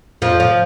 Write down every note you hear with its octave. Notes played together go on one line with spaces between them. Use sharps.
F2 F3
F3